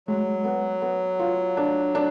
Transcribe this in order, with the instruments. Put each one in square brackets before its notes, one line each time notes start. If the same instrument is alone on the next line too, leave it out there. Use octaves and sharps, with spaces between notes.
[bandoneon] F#3 [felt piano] G#3
[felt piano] B3
B3
F4
D4
D4